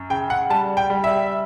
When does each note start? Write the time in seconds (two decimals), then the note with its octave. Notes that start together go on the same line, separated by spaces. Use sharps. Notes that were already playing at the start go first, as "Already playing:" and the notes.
Already playing: F#2
0.10 C#3 G5
0.30 F#5
0.50 G3 A5
0.77 G5
0.90 G3
1.04 E5